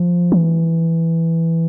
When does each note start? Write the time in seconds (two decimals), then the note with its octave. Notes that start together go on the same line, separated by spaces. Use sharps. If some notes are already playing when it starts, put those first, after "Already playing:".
Already playing: F3
0.32 E3